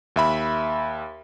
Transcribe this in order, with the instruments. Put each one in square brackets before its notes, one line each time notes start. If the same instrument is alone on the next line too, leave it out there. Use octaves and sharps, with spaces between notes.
[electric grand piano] D#2 E5 B5